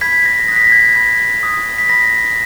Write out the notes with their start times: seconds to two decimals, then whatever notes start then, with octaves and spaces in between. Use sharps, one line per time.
0.01 B5 G#6 B6
0.25 A#6
0.48 D#6 A#6
0.52 F#6 B6
0.64 A#6
0.72 G#6
0.95 B5 G#6
1.43 D#6 F#6
1.78 B6
1.89 B5 A#6